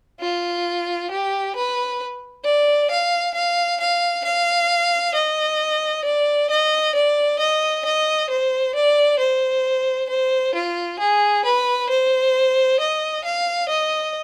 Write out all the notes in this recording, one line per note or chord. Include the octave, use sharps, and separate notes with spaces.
F4
G4
B4
D5
F5
F5
F5
F5
D#5
D5
D#5
D5
D#5
D#5
C5
D5
C5
C5
F4
G#4
B4
C5
D#5
F5
D#5